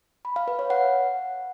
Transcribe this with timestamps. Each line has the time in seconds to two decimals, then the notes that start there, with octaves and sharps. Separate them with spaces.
0.25 B5
0.36 F5
0.48 B4
0.59 C#5
0.70 F#5